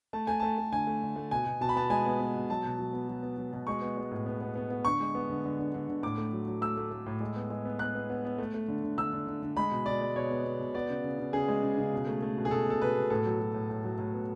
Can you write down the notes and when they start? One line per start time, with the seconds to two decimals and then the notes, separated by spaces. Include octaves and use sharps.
0.13 A3 A5
0.27 A3 G#5
0.40 A3 A5
0.58 A3
0.73 D3 G#5
0.87 A3
1.02 D3
1.16 A3
1.31 B2 G#5
1.46 B2
1.61 B2 A5
1.69 B5
1.75 B3 A5
1.90 G#3 G#5
2.06 B3
2.20 B3
2.35 B2
2.50 F#3 A5
2.64 B2
2.79 F#3
2.93 B3
3.08 F#3
3.23 B3
3.37 F#3
3.53 B2
3.67 G#3 C#6
3.82 B3
3.97 G#3
4.11 A2
4.26 B3
4.41 B3
4.55 B3
4.70 B3
4.85 D3 C#6
5.00 G#3
5.15 B3
5.29 D3
5.45 D3
5.59 D3
5.74 D3
5.89 D3
6.03 A2 D6
6.18 A3
6.33 F#3
6.48 F#3
6.61 A3 E6
6.77 A3
6.91 A3
7.06 A2
7.20 G#3
7.36 B3
7.50 G#3
7.65 B3
7.79 B3 F#6
7.95 B3
8.10 B3
8.25 B3
8.38 A3
8.54 A3
8.68 D3
8.83 D3
8.98 D3 E6
9.13 D3
9.27 D3
9.42 D3
9.57 G#3 B5
9.71 B2
9.86 B2 D5
10.01 G#3
10.16 B2 C#5
10.30 B3
10.45 B3
10.59 B2
10.74 B3 D5
10.90 C#3
11.04 C#3
11.19 C#3
11.33 C#3 G#4
11.48 G#3
11.63 C#3
11.78 C#3
11.93 B2
12.07 A3
12.22 A3
12.37 B2
12.45 G#4
12.51 B2 A4
12.66 B2 A4
12.82 B2 B4
12.96 B2
13.10 A2 A4
13.26 F#3
13.40 F#3
13.54 A2
13.70 A2
13.84 F#3
13.98 A2
14.14 B3